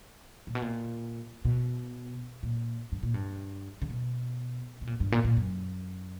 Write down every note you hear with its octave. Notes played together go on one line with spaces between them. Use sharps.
A#2
B2
A#2
B2
A#2
G2
A#2
G2
C#3
B2
B2
A#2
G2
A#2
A#2
F#2